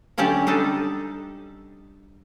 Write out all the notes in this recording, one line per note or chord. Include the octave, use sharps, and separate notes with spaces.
D3 F#3 C#4 G4 D5 A5
G3 D4 D#4 A4